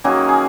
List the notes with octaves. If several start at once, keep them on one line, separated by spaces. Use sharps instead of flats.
D#3 F#3 A#3 C#4 G#4
G#4